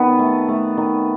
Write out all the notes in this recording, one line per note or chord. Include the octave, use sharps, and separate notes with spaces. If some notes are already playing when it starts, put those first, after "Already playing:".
Already playing: D#3 B3
A3
A3
D#3